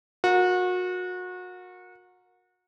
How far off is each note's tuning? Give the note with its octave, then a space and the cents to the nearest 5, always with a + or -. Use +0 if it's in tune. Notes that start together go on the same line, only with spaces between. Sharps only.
F#4 -30 A#4 +0